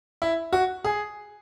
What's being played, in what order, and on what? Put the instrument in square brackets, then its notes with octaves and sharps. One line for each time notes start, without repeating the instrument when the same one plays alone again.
[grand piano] E4
F#4
G#4